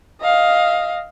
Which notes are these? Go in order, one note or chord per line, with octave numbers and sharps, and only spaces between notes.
D#5 F5